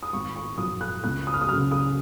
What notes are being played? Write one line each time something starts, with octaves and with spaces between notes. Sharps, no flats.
D#6
G#1 C#6
C#6
F#2 F3 D#6
F#6
C#2 F#6
D#6
F6
D#6
C#3 F#3 F6
D#6